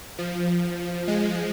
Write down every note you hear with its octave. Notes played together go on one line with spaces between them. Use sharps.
F3
G#3